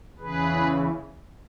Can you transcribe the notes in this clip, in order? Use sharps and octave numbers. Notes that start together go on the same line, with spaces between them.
E2 C#3 E3 G#4 B4